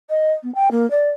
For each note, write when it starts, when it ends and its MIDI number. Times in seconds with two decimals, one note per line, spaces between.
0.09 0.32 75
0.43 0.53 59
0.54 0.68 79
0.71 0.88 58
0.90 1.08 74